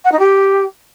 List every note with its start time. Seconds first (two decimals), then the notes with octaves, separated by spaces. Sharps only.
0.04 F#5
0.11 D#4
0.19 G4